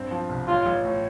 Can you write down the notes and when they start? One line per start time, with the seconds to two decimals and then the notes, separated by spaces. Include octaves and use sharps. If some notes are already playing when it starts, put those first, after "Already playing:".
Already playing: G2 C4
0.11 F3
0.29 C2
0.48 A1 F4
0.66 A1
0.85 A2